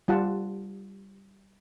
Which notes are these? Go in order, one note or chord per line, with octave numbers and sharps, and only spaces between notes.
G3 F4 F#5 A5